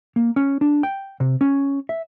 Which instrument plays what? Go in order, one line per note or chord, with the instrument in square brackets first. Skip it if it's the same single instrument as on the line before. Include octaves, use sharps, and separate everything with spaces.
[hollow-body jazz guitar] A#3
C#4
D4
G5
C3
C#4
E5